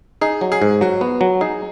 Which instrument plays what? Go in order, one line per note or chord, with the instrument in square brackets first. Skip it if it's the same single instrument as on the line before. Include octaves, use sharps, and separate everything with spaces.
[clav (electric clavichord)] D#4 [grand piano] G#4
[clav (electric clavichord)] F#3
[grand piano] G#4
[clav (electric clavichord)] G#2
[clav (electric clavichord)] F#3 [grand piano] F#4
[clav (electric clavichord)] B3
F#3
[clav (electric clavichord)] D#4 [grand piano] G#4